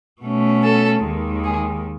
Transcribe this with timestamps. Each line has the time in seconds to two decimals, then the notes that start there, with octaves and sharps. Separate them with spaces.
0.23 B2 A3 C#4
0.63 A4
1.04 D#2 D#3 G#3
1.44 G#4